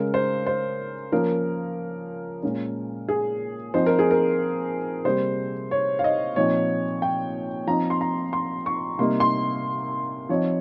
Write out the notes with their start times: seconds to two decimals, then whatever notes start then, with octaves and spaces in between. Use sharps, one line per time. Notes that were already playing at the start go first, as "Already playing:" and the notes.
Already playing: C#3 G#3 C#4 A#4
0.14 C5
0.46 C5
1.12 F3 A#3 C#4 A#4
2.43 A#2 G#3 C#4
3.08 G#4
3.74 F3 C4 D#4 C5
3.86 A#4
3.99 G#4
4.11 A#4
5.05 C3 G3 A#3 C5
5.71 C#5
5.99 F5
6.04 D#5
6.36 A#2 F3 C4 D#4 C#5
7.02 G5
7.67 F3 C4 D#4 A#5
7.90 C6
8.01 A#5
8.33 C6
8.66 C#6
8.99 C3 G3 A#3 D#4 C6
9.20 C6
10.29 F3 C4 D#4 C#5